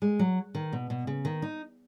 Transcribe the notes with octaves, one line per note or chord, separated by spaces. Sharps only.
G#3
F#3
D#3
B2
B2
C#3
D#3
D#4